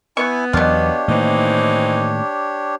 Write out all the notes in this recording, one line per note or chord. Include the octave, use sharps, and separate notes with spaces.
B3 E4 G#5 C#6
E2 B2 F#3 D4 F4 G4 C#5
A2 D#3 E3 A#3 C4 D#4